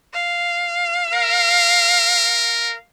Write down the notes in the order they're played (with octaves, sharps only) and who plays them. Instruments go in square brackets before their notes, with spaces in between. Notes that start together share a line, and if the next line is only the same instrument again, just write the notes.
[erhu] F5
[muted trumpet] A#4